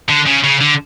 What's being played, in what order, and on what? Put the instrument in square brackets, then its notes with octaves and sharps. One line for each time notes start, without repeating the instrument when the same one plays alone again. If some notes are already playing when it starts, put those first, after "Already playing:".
[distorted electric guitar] D3
C#3
C#3
D3